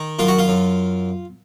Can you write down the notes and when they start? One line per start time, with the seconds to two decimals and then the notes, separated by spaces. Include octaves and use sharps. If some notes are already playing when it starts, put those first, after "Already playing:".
Already playing: D#3
0.19 F#2 F4
0.28 F#4
0.39 F4
0.48 F#2